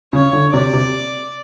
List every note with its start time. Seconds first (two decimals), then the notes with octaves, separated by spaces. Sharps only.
0.13 C#3 C#5
0.33 D3
0.54 C3 D5
0.73 C3